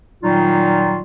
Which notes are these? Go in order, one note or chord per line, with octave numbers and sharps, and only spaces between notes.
A#2 D#3 F#3 G3 D#4 F4